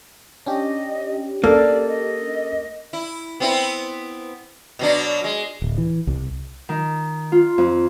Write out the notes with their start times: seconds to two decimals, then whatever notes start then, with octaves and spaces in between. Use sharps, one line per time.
0.46 C#4 D4 G4 D#5
1.44 A#3 A4 D5
1.88 D#5
2.93 E4
3.40 B3 C4 E4
4.79 B2 F#3 D4
5.24 G#3
5.62 D1
5.78 E3
6.07 C2
6.69 D#3
7.32 F4
7.58 F2